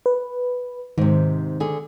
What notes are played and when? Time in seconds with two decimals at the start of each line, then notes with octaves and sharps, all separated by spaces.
0.06 B4
0.98 G#2 C3 D#3
1.60 D3 G#4